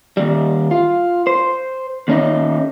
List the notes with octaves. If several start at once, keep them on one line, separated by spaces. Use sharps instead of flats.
D#2 G3
F4
C5
D#2 C#4 D#4